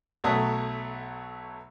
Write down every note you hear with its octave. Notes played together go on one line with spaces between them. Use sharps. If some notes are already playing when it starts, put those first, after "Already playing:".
B1 F#3 A3 E5 D#6